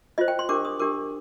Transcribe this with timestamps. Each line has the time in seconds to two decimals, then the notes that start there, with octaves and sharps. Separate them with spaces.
0.18 F4 C5 D#5
0.28 G5
0.39 C6
0.49 D4 G4 A#4 D6
0.65 D#6
0.79 D4 G4 A#4 D6